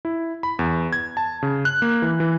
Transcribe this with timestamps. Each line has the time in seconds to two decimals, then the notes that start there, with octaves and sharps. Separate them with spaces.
0.05 E4
0.43 B5
0.59 E2
0.93 G#6
1.17 A5
1.43 C#3
1.65 F#6
1.82 A#3
2.02 E3
2.20 E3